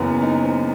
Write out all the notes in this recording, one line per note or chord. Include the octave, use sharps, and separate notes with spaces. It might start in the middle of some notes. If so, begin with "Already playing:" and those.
Already playing: F#1 F#2 E3 B3
D#4
C4